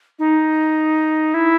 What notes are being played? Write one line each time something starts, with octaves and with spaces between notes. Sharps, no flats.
D#4
E4